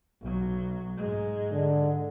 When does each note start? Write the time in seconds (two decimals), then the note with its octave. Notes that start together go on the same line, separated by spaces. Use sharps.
0.21 B1 F#3
0.97 G#2 G#3
1.52 D3